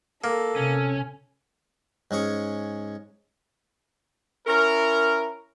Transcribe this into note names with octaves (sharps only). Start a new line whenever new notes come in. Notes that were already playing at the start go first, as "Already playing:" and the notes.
A#3 A4
C3 C#4
G#2 C#4 G#4 C#6
C#4 E4 A#4